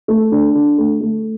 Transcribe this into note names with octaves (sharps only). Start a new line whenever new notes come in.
A3
D3 D4
D3
A3
A3